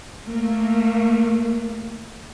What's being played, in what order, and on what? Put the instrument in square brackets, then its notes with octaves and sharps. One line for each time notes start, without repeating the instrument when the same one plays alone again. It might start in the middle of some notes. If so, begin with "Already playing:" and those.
[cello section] A3 A#3